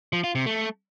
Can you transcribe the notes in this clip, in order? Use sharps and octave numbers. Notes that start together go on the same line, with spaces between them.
F3
F4
C3
A3